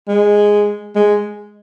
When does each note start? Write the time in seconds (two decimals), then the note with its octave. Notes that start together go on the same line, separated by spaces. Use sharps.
0.08 G#3
0.95 G#3